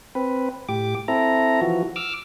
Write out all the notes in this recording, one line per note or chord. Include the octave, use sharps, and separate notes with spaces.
C4 B4
A2 G4 D6
C4 E4 A4 A#5
E3 F3 F#4
D6 E6 F6